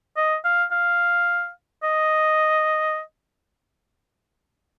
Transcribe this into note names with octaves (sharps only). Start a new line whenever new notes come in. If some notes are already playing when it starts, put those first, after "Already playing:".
D#5
F5
F5
D#5